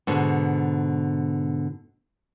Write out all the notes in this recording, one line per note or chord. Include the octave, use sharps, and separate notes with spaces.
G#2 B2 D3